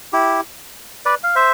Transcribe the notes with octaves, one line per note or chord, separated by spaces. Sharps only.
E4 G4
B4 D5
F5
C5 E5